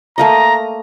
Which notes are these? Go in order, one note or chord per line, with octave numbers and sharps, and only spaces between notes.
A3 A#3 D#5 A#5